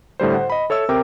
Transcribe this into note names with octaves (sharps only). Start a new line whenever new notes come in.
A2 D3 G3 C5
C5 F#5
D#5 B5
A4 C#5 E5 E6
C3 A#4 G5 D6